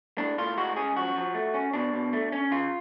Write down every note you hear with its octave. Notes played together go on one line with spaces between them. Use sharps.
A2 D4
A2 F4
G#3 F#4
C#4 G#4
F3 F#4
F3
A3
C#4
B2 D4
B2
A3
C#4
C#3 F4